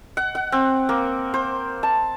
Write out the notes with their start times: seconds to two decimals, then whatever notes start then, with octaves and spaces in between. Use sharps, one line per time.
0.17 F#5
0.35 F#5
0.52 C4
0.89 A#3
1.34 C5
1.83 A5